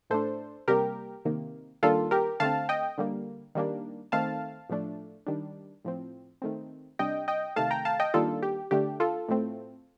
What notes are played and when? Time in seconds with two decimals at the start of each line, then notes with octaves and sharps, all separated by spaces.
0.10 A2 A3 D4 A4 C5
0.68 C3 G3 A#3 G4 A#4
1.25 C3 D#3 A#3
1.83 D#3 G3 A#3 D4 F4 A4
2.11 G4 A#4
2.40 D3 A3 C4 F5 A5
2.69 D#5 G5
2.98 D3 G3 A#3
3.55 D#3 G3 A#3 D4
4.12 D#3 A3 C4 F5 A5
4.70 A2 F3 A3 D4
5.27 D#3 G3 D4
5.85 A2 F3 C4
6.42 D#3 A3 C4
6.99 C3 G3 D4 D#5 G5
7.28 D#5 G5
7.56 C3 D#3 A3 F5 A5
7.71 G5 A#5
7.85 F5 A5
8.00 D#5 G5
8.14 D#3 G3 A#3 D4 F4 A4
8.43 G4
8.71 D3 A3 D4 G4
9.00 F4 A4
9.28 A2 A3 C4